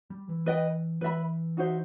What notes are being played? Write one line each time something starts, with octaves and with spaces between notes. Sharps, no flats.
G3
E3
B4 D#5 G5
E3 B4 E5 B5
D#4 F#4 C5 E5